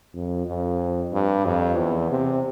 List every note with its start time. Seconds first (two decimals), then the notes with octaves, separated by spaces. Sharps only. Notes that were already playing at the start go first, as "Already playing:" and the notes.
0.14 F2
0.46 F2
1.12 G2
1.45 F2
1.77 E2
2.10 C3